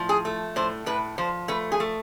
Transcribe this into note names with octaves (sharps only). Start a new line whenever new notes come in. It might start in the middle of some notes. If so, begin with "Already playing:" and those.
Already playing: A2 F3
G#4
A3
A2 C5
A2 B4
F3 C5
A3 B4
G#4
A3